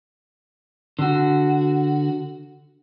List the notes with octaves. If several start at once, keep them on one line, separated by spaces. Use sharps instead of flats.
D3 F#4